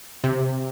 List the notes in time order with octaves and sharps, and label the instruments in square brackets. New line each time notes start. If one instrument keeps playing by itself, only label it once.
[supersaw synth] C3